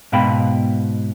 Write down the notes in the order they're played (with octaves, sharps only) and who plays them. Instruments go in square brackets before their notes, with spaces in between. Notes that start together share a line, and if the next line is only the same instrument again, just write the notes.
[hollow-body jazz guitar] G#2 B2 F5 G5 B5